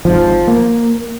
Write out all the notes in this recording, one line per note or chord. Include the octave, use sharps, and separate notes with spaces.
G#1 G#2 F3
A#3